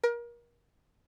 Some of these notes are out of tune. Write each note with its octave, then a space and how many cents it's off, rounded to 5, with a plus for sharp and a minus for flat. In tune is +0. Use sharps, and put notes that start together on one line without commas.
A#4 +30